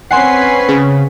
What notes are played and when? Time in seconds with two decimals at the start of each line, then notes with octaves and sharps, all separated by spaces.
0.11 C4 C#4 B4 F#5 G#5 C6 C7
0.69 C#3